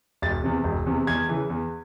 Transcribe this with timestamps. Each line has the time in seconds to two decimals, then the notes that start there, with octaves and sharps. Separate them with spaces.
0.22 E1 A6
0.44 E2 C3
0.64 E1
0.86 E2 C3
1.07 E2 G#6
1.29 C#3 E3
1.50 E2